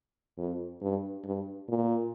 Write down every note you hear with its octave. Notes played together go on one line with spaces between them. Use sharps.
F2
G2
G2
A#2